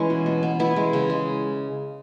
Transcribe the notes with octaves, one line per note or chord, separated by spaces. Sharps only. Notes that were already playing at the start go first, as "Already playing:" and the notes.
Already playing: E3 G#3 C#4 E4 G#4 B4
B2
B2
B3
B3 E4
G#3
C#3
G#3